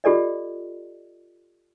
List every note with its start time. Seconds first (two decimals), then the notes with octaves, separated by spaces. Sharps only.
0.04 F4 G4 A4 D5 D#5